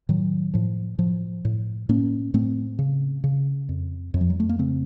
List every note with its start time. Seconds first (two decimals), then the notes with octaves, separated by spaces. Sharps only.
0.09 A2 D#3 F#3
0.54 A2 F3
0.98 A2 F3
1.45 A2
1.89 A2 A#3 C#4
2.34 A2 A3 C4
2.79 C#3
3.24 C#3
3.69 F2
4.14 F2
4.21 F3
4.30 F#3
4.40 A3
4.49 A#3
4.59 C#3 A3 C4